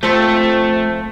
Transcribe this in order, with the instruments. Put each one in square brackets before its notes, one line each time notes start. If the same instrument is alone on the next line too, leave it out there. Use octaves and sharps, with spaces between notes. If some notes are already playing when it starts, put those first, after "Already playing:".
[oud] F3 C4 [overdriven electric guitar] A3